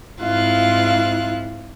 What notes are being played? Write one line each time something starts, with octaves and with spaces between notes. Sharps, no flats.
G#2 C4 E4 F4 F5 F#6